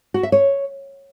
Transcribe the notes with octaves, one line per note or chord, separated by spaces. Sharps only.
F#4
E5
C#5